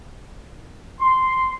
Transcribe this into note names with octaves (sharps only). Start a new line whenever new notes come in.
C6